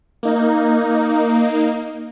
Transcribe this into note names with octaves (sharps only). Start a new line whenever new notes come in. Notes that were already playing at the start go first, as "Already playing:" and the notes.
A#3 D#4